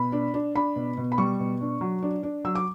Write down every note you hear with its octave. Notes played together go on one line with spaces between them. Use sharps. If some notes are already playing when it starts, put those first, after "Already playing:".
Already playing: B2 B5
D4
D4
D4 B5
B2
B2
B5
G3 C#6
B2
D4
F#3
D4
D4
F#3 E6
D6